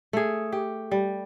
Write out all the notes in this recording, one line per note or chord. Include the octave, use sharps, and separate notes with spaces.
A3 G#4
G4
G3